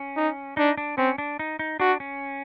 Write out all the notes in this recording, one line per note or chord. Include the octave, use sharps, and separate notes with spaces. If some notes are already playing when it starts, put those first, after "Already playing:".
Already playing: C#4
D#4
D4 D#4
D4
C4 C#4
D4
D#4
D#4
D4 F#4
C#4